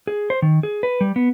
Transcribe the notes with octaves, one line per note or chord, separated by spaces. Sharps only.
G#4
C5
D#3
G#4
B4
G3
B3